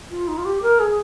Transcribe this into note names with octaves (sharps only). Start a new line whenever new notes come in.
F4
D#4
F4
G4
A#4
G#4